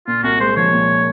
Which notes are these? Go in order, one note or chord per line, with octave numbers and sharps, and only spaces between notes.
A#2 F4
C2 F#4
G#3 C5
F3 C#5
A#2